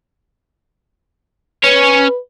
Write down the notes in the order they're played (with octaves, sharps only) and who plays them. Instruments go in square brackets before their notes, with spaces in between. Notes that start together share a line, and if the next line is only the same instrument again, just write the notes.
[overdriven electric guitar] C#4 C#5 [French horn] B4